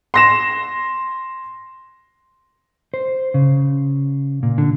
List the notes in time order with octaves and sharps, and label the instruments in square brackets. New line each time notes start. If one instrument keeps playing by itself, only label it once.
[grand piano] C6 A#6 E7
[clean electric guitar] C5
C#3
A#2
D3